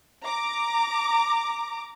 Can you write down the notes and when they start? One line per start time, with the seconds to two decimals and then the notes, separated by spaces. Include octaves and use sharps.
0.24 A#5 D6